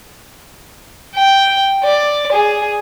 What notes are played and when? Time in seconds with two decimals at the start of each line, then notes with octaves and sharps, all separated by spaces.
1.15 G5
1.84 D5
2.32 G#4